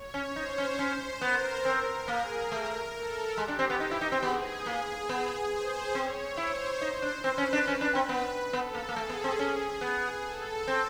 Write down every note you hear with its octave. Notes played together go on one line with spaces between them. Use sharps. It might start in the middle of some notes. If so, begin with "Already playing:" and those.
Already playing: C#5
C#4
D#4 C5
C#4
C#4 C5
B3 A#4
C4
A#3 G#4
A3 A#4
A4
G#3 G4
D4
C4
B3
D#4
E4
D#4
C4
B3 G#4
A#3
B3 G#4
C5
C4 C#5
E4 C5
D#4
D4
C4 B4
C#4
D4
C#4
D4
C4
B3
B3 A4
A#3
A#3
A3 G#4
B3
C4
C#4
B3
A4
C4